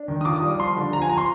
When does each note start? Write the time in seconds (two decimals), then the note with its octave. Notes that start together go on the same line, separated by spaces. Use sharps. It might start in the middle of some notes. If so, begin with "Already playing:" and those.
Already playing: D4
0.08 D#3
0.21 D#6
0.25 F4 D6
0.36 D#6
0.42 G3
0.59 F3 C6
0.77 D3
0.93 F3 A#5
1.02 G#5
1.09 F3 A#5
1.18 C6